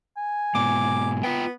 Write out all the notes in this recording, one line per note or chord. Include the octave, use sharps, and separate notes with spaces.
G#5
G#2 B2 D6
B3 F4 B4 G5